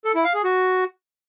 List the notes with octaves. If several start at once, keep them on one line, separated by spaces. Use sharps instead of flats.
A4
E4
F5
G#4
F#4